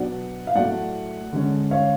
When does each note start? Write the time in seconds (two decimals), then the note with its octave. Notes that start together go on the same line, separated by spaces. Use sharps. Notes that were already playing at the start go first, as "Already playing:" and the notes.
Already playing: B2 F#3 B3 D4 D5 F#5
0.47 F5
0.55 A2 F#3 A3 D5 F#5
1.33 D3 G#3 C#4
1.71 C#5 F5